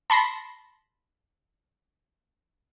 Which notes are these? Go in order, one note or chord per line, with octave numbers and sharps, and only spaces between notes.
A5 B5 C6 A#6